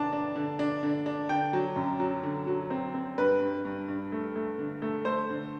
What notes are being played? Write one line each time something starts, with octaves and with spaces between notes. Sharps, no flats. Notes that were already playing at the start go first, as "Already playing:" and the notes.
Already playing: D3 D4 A5
D4
D3
D4
D3
D4
D3 G5
F#3
F#2
F#3
D3
F#3
C4
C4
G2 B4
G2
G2
G2
A3
A3
D3
A3
A3 C5
D3